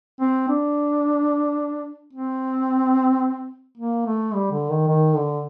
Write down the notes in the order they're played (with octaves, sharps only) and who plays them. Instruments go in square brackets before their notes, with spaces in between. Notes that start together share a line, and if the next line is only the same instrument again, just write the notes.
[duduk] C4
D4
C4
A#3
A3
G3
D3
D#3
D#3
D3